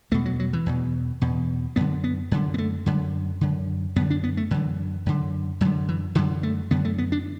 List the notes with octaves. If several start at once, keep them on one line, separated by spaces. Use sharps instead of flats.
E2 B2 A3
F#3
F#3
E3
E2 B2
E2 B2
F#2 D3 B3
B3
F#2 D3
B3
A3
F#2 D3
F#2 D3
F#2 D3 B3
D4
B3
A3
F#2 D3 E3
F#2 D3
F#2 D3 F#3
E3
F#2 D3 F#3
A3
F#2 D3 B3
A3
B3
D4